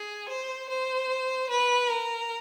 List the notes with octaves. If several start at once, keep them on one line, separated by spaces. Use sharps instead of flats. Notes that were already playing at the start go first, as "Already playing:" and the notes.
Already playing: G#4
C5
C5
B4
A#4